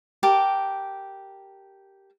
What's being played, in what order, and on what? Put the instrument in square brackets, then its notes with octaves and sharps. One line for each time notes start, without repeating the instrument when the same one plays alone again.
[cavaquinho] G4 A#4 A5